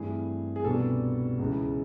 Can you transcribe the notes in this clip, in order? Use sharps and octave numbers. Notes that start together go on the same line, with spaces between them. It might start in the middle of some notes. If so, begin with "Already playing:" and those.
Already playing: G2 E3 A3 C4 E4 G#4
G#4
C2 B2 G3 B3 D4 A4
C#2 C#3 E3 G#3